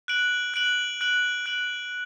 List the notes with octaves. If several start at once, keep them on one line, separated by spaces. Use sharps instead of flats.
F#6 D7 F#7
F#6 D7 F#7
F#6 D7 F#7
F#6 D7 F#7